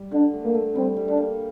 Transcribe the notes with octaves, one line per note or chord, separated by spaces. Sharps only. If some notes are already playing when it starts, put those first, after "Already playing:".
Already playing: G3
D3 D4
A3
A#3
A3
G3 C4
G3
D4
A#3